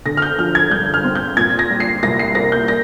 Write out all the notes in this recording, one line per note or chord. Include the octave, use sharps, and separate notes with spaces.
D3 A#6
F6
G6
F3 F6
G#6
G2 G6
F6
C4
G6
A#2 G#6
A#6
G3
C7
C2 A#6
C7
A#3 A#6
G6
A#6